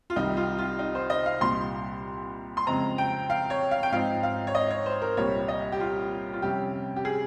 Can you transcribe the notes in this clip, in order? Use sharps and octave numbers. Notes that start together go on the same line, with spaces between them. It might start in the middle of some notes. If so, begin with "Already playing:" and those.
F4
C2 C3 D#3 G3 D#4
F4
F4
D#4
C5
D#5
F5
C2 A#2 G3 C6
C6
F2 C#3 G#3 C4 A#5
G5
F5
C#5
F5
G5
G#2 F3 C4 D#4 F5
F5
C#5
D#5
C#5
C5
A#4
C2 A#2 G3 C#5
D#5
G4
F4
F4
F2 C3 G3 C#4 G4
G4
G#4